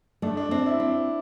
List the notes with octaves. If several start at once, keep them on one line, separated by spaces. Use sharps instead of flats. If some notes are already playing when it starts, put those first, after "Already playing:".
A3 D4
D4
C4 D4
E4
C4